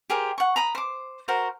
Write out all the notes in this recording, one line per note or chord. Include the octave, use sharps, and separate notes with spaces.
G4 G#4 A#4 C5
F#5 C#6
A#5 B5 D#6
C5 D6
F#4 A#4 C5 A#5